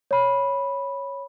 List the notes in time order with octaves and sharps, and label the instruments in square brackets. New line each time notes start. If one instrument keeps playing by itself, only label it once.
[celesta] C#5 B5